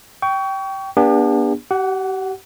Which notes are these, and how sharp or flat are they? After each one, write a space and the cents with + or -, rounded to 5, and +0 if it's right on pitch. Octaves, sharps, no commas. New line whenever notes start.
G5 -15 C#6 +25
B3 -35 D4 +0 G4 +40
G4 -35 F#5 +10